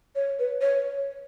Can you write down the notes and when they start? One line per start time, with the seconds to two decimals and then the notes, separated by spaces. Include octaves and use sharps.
0.16 C#5
0.39 B4
0.61 C#5